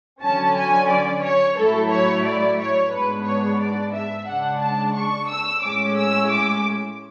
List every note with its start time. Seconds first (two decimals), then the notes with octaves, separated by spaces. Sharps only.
0.22 D3 F#3 C#4 A5
0.56 G#5
0.89 D5
1.23 C#5
1.57 A2 F#3 A3 E4 A4
1.91 C#5
2.25 D5
2.59 C#5
2.92 G#2 G#3 B3 D4 B4
3.26 C#5
3.60 D5
3.94 E5
4.27 C#3 G#3 D4 F#5
4.61 A5
4.95 C#6
5.29 E6
5.63 A2 G#3 C#4 D6
5.97 E6
6.30 D6